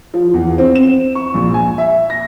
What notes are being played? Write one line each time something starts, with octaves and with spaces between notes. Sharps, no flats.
F3
E2
C4
E7
C#6
A#1
G#5
E5
A#6